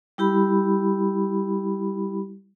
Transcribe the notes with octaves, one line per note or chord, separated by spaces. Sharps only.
G3 E4 G4 B5